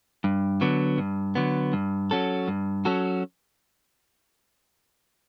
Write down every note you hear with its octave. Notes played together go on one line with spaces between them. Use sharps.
G2
D3 F#3 B3
G2
D3 F#3 B3
G2
F#3 C#4 F#4 A4
G2
F#3 C#4 F#4 A4